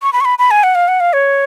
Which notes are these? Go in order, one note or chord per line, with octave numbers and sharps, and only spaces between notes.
C#6
B5
C#6
B5
B5
G#5
F#5
F5
F#5
F5
C#5